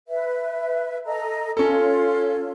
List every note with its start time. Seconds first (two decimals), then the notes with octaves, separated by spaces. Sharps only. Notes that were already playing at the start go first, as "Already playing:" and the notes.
0.07 B4 E5
1.05 A4 D#5 A#5
1.57 C#4 F4 A4 C#5